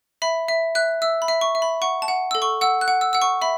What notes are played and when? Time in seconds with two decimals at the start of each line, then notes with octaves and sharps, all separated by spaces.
0.22 E5 B5
0.49 E5
0.75 E5 F#6
1.02 E5 E6
1.22 B5
1.28 E5
1.41 C#6
1.55 E5
1.62 B5
1.82 F#5 C#6
2.02 A5
2.08 F#5
2.31 A4 E6
2.42 C#6
2.61 F#5 E6
2.81 F#6
2.88 F#5
3.01 E6
3.13 F#5 E6
3.22 C#6
3.42 E5 B5